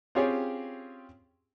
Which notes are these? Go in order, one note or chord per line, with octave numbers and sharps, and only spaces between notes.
C4 C#4 F4 G4 G#4 C#5